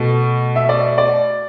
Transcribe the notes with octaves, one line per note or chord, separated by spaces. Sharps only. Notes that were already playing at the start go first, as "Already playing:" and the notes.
Already playing: B2 A3
E5
D5
D5